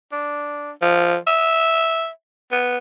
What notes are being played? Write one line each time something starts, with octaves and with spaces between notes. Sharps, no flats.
D4
F3
E5
B3